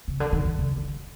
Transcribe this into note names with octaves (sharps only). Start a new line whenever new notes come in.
C#3
D3
D#3
D3
C#3
D3